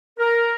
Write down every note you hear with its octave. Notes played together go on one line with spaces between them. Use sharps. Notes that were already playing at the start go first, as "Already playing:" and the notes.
A#4